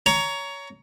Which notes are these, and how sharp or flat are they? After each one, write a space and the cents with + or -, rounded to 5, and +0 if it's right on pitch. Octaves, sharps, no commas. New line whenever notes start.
C#5 +20 A#5 +0